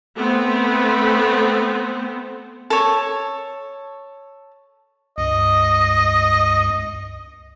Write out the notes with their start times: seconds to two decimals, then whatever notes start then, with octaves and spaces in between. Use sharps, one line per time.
0.17 A3 B3 C4
2.70 A4 C#5
5.18 C#2 G2 D#5